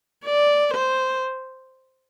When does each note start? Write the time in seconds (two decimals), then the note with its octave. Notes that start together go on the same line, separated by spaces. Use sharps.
0.25 D5
0.74 C5